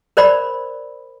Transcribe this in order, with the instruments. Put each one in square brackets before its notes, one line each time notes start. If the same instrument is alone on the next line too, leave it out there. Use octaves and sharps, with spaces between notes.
[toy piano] A#4 C5 D5 B5